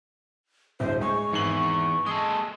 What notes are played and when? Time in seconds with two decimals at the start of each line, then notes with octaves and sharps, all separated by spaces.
0.80 D1 G1 E4 C5
1.01 G#3 C#6
1.32 G#1 E2 E3 C7 F#7
2.06 G#3 A4 D#6